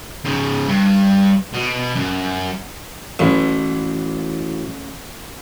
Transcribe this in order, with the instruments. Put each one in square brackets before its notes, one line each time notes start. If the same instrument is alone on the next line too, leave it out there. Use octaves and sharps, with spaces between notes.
[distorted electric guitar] G#2 C#3
G2
B2
F#2
[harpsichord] A1 [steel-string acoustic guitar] A2 E3 F#3